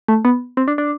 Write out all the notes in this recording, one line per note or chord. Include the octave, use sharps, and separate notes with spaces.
A3
B3
C4
D4
D4